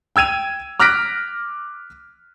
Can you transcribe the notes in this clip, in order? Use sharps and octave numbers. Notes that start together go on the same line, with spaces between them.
G5 E6 G#6 D#7 F7
D6 F6 F#6 A#6 B6 D7